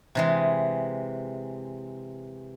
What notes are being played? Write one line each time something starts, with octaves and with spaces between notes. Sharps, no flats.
C3 E3 G#3